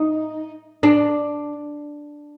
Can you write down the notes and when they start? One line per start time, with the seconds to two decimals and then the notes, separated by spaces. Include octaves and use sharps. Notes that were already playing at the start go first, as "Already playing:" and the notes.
Already playing: D#4
0.83 D4